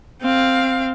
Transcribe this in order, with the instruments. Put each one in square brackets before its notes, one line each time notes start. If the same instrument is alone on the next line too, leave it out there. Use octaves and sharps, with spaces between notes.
[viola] C4 F5